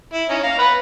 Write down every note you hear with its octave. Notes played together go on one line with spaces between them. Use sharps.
E4
C#4 D#4
F5 A#5
B4 F#5 B5